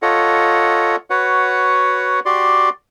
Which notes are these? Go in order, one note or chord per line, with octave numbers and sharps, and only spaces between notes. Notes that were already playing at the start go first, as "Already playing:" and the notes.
F4 A4 C#5 D#5 F#5
F#4 B4 C#5 F#5
F#4 G4 D5 C6